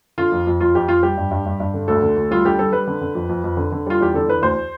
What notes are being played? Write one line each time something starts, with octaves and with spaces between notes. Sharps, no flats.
D3 F4
F2
F2
F2 F4
F2 G4
F2 F4
G3 G4
G2
G2
G2
G2
D3
D2 A4
D3
D2
G3 F4
D3 G4
G3 A4
G3 B4
D3
D3
F2
F2
F2
D3
D3
G3 F4
E2 G4
D3 A4
E2 B4
D2 C5